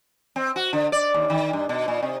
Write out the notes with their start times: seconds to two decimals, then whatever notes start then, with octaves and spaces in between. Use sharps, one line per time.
0.36 C4
0.56 F#4
0.73 D3
0.92 D5
1.14 D#2
1.30 D#3
1.53 G2
1.69 B2
1.88 A#2
2.03 C3